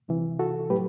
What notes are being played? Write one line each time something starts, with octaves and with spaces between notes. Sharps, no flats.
C2 C3 E3
F#4 A4
A2 F#3 A3 G4 B4